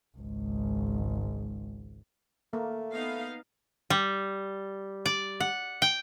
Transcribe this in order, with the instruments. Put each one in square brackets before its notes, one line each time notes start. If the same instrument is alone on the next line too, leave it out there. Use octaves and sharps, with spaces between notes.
[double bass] G#1 C#2
[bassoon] A3 [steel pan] A#3
[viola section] B3 D#4 F5
[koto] G3
D5
F#5
G5